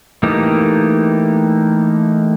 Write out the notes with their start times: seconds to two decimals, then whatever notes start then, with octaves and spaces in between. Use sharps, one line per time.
0.23 E3 A3 A#3 D#4 G4